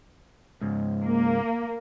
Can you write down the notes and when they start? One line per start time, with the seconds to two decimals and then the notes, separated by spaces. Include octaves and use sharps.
0.61 C#2 G#2
1.04 A#3